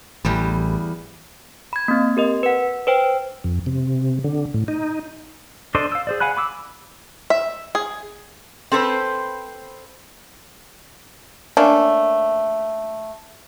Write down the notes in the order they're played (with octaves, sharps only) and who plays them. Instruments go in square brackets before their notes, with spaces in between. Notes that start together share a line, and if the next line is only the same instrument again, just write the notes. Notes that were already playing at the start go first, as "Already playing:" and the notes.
[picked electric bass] A1 [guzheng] E2 G3
[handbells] B5 G#6
A#3 C4
G4 A#4 D#5
B4 F#5
B4 C5 G5
[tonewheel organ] F2
C3
D3
A2
D#4
[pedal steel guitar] D4 A4 C5 D5 D#5
F5 E6
G#4 C5 D5
F5 F#5 G#5 B5 F#6
B5 D6 E6
[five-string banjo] E5
G#4
[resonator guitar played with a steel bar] C4 A4 B4 C5
[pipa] A3 A#3 C#4 D4